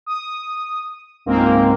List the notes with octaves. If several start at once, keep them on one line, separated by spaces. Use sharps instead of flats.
D#6
C#2 G#2 A#3 C4